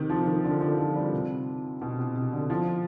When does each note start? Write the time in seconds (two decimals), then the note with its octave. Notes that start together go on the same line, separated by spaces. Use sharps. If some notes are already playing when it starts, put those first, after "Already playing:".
Already playing: C3 D#3
0.10 F3
0.27 D#3
0.44 D3
0.61 D3
0.78 F3
0.96 G3
1.12 C3
1.82 B2
1.99 C3
2.16 C3
2.33 D3
2.50 F3